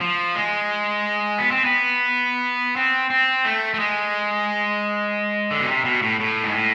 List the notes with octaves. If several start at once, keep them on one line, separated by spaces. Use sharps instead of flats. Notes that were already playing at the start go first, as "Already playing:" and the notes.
F3
G#3
B3
C4
B3
C4
C4
A3
A3
G#3
D3
B2
C3
B2
A2
A2
G#2
A2